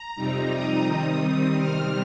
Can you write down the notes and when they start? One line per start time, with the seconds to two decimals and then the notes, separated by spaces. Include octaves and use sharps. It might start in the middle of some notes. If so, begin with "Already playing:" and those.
Already playing: A#5
0.16 F2 C3 G3 C4 D#4
0.50 D#6
0.85 D#3 G3 C4 D#4 D#6
1.56 C3 D#3 G3 C4 F6